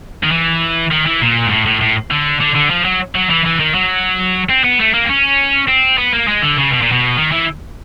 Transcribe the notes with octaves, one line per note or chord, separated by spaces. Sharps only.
D#3
E3
D#3
E3
A#2
G#2
A2
A2
A2
D3
D3
D3
F3
F#3
F#3
E3
E3
D#3
F#3
C4
B3
A3
A#3
C4
C#4
C4
B3
A#3
G#3
D3
C#3
B2
A#2
B2
D#3
E3